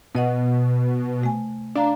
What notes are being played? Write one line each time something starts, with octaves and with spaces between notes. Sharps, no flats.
B2 B4 D#5 F#5
C3 A3 G#5
D4 D5 F5 A#5